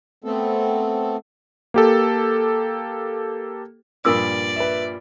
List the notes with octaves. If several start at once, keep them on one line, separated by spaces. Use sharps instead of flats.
A3 B3 C4 A4
A#3 G4 A4
G2 A#2 F3 A#4 D5 D#6 E6
B4 E5